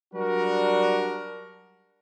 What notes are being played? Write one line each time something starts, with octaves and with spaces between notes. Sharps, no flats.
F#3 G3 D4 F#4 A#4